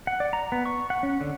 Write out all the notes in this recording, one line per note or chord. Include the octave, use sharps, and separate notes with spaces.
F#5
D5
A#5
B3
C#6
F#5
C#4
D3